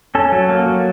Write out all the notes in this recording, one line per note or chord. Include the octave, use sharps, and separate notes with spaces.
C#4 A4
F#3
A#3
F#3